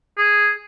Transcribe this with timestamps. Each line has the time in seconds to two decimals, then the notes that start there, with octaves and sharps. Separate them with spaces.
0.18 G#4